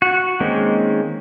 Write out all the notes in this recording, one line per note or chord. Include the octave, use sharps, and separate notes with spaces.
F#4
D#3 G#3 A#3 C4 C#4